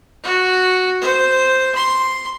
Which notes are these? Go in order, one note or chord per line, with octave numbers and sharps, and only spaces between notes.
F#4
C5
C6